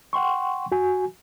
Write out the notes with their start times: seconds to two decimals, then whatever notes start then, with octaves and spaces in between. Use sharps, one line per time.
0.13 F#5 G5 C6 C#6
0.72 F#4 G#5